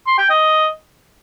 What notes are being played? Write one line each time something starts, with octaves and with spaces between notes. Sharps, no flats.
C6
G5
D#5